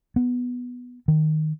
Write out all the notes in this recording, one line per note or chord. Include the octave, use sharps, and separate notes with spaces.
B3
D#3